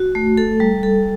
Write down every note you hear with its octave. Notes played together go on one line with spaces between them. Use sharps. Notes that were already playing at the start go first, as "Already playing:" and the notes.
Already playing: F#4
A3
A4
G3
A4